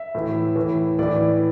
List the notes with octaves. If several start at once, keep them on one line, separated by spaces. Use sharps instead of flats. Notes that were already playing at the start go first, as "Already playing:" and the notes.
Already playing: E5
A2 E3
A2 E3
A2 E3 D5